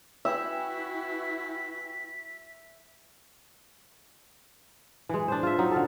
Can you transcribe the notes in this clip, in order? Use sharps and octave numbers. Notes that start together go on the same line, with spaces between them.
E4 F#4 B4 E5 G5 G#5 B6
E3 G#3
D4 C5
F4 E5
F#3 C4 D#4
D3 F4 A4